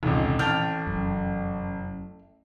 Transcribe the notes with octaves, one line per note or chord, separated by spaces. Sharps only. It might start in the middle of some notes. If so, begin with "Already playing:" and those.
F1 C#2 A#2 D#3 E3
A1 A3 G5 F6
F1 F#2